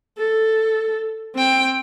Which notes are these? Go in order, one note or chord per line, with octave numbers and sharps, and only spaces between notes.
A4
C4 G5